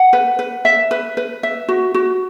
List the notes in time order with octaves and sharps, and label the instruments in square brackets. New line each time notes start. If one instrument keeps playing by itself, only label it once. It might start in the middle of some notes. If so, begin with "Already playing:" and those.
Already playing: [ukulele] F#5
B4
B4
E5
B4
B4
E5
F#4
F#4